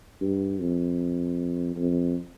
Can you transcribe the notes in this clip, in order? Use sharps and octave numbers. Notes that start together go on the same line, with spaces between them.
G2
F2
F2